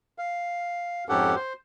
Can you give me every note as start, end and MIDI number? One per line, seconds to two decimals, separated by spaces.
0.18 1.04 77
1.09 1.35 41
1.09 1.35 44
1.09 1.35 61
1.09 1.35 67
1.09 1.35 69
1.09 1.35 78
1.35 1.53 72